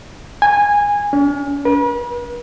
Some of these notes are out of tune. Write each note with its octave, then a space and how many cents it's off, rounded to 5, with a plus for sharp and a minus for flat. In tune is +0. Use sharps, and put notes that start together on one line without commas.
G#5 -15
C#4 +45
B4 -40